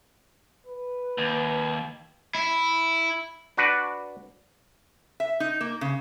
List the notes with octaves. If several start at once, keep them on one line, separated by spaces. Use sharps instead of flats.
B4
D#2
E4
D4 F#4 B4 D5
E5
D#4
A#3
C#3